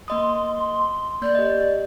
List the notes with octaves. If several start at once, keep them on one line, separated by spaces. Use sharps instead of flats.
A#3 D#5 C6 D#6
A#3 D5 G6
G4 D#5